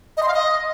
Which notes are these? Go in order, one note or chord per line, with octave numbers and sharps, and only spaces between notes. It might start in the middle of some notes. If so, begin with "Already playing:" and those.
D#5
C6
F5
D#5